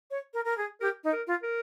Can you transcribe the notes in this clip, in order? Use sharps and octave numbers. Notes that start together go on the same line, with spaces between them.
C#5
A#4
A#4
G#4
G4 A#4
D#4
A#4
F4
A#4